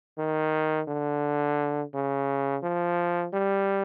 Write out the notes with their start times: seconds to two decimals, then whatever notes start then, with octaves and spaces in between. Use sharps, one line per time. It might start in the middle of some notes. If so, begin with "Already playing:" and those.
0.18 D#3
0.88 D3
1.94 C#3
2.63 F3
3.33 G3